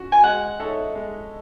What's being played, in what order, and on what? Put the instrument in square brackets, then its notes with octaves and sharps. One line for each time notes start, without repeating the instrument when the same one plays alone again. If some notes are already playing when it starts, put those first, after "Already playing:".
Already playing: [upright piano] C#4 F#4
[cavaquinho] G#5
[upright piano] G#3 [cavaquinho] F#5
[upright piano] D#4 A4 C#5 E5
G#3